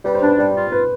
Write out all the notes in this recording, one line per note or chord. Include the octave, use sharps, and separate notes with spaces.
G3 B4
C5
D4 B4
G3
F4
B4